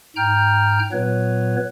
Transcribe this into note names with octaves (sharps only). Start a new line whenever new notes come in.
G#2 G5 A#5 F6 G6
A#2 F#3 B3 B4 C#5